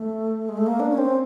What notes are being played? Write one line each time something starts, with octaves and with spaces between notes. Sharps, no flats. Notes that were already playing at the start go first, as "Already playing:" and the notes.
Already playing: A3
G#3
A3
A#3
D4
C#4
C4